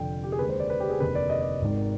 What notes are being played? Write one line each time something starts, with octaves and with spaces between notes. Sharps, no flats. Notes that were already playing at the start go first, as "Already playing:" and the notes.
Already playing: F1 F2 D3 F3 G5
G4
G#4
D#2 D3 G#3 B4
C5
D5
B4
G4
G#4
F1 D#2 D3 B4
D5
D#5
D5
G#1 G#2 D#3